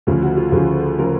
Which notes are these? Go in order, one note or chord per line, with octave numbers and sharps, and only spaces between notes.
D2 C#3 F3
F#4
F4
D2 C#3 F3 G#4
C#3 F3 A#4